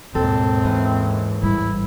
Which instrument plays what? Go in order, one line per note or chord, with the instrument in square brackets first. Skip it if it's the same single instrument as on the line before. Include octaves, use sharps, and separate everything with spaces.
[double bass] D#2 G#2 [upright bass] B2 F4 [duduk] C4 [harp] A4
[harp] E3 [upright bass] C#4
[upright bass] A1 G3 [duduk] E4